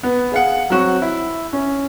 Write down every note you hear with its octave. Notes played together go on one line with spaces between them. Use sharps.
B3
G#4 F5 F#5
F#3 C4 F#4 C#6
E4
C#4